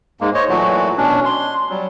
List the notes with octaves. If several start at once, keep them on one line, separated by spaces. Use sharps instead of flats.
G#2 G#3 A#3
C5 C#5 D#5
A#2 E3 F#3 A3 F#4
B2 C#4 D4
C6
F#3 G3